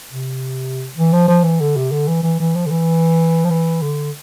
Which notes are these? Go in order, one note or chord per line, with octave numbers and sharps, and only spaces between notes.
C3
E3
F3
F3
E3
D3
C3
D3
E3
E3
E3
F3
D3
E3
F3
E3
D3